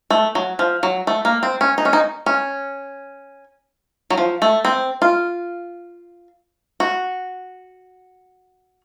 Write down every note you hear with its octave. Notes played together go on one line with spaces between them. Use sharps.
A3
F#3
F3
F#3
A3
A#3
C4
C#4
D#4
C#4
D#4
C#4
F#3
F3
A3
C4
F4
F#4